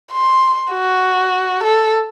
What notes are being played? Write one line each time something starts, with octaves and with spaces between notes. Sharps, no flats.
C6
F#4
A4